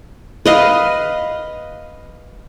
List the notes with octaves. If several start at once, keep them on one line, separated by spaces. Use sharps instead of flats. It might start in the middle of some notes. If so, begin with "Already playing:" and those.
B4 D#5 F5